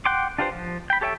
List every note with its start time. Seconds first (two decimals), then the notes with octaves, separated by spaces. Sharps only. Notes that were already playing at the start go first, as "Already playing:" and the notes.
0.05 F#5 G5 C6 D6
0.38 D4 F4 G4 B4 C5
0.52 F3
0.90 G5 B5
1.01 G4 A4 C#5 E5 G5